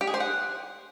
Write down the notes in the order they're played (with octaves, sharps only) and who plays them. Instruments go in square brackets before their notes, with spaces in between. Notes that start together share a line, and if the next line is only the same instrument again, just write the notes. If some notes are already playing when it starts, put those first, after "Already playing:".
[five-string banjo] G4
G#4
C5
F#5